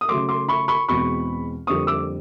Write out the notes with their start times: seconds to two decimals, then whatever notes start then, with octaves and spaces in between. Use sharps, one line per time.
0.01 D#6
0.09 C#3 F#3 A3 C6 D6
0.29 C6 D6
0.49 B5 C#6
0.68 B5 C#6
0.89 E2 B2 G#3 C4 B5 C#6
1.67 F2 D3 G3 A#3 C#6 D#6
1.87 D6 E6